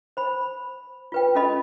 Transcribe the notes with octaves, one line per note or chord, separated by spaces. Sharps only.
C5 B5
F4 B4 G5
C#4 F4 A4 D#5 B5